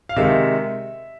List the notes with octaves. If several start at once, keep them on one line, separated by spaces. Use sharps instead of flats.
F5
C3 D#3 G#3 E5